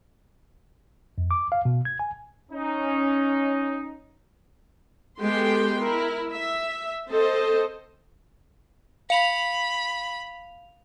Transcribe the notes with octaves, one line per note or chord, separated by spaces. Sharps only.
F2
D6
F5
B2
G#6
G#5
C#4 D#4
G#3 B3 G4 A4 G5 C6
E4 A#4
E5
C4 A4 C5 D#5
F5 B5 F7